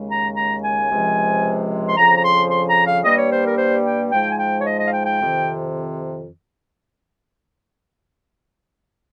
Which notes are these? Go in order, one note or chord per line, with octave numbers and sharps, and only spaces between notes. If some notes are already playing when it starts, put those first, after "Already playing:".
Already playing: D#2 C#3 G#3
A#5
A#5
G#5
C#2 C3 F3 G#3
C6
F2 C#3 F3 A#5
A#5
C6
C6
A#5
F5
G2 G3 A#3 D#5
C#5
C5
A#4
C5
G5
G#2 F3 G#3 G5
G#5
G5
C#5
D#5
D#5
F5
G5
G5
F2 C3 D#3